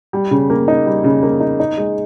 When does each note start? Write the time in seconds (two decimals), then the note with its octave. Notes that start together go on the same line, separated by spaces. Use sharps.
0.13 G3
0.31 C#3
0.50 A#3
0.68 D#4
0.86 G3
1.04 C#3
1.23 A#3
1.40 D#4
1.60 D#4
1.78 G#3